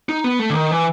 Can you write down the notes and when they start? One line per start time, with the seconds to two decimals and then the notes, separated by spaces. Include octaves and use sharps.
0.09 D#4
0.24 B3
0.39 A3
0.50 D3
0.54 D#3
0.71 E3